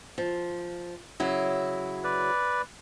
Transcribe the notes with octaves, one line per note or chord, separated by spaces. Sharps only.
F3
C#3 F#3 E4
B4 D5